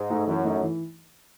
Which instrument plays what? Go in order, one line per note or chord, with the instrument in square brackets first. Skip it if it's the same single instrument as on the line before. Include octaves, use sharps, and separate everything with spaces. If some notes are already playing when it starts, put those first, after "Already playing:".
Already playing: [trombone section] G#2
[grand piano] A3 D#4
[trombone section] F#2 [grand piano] E3
[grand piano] A3 D#4
E3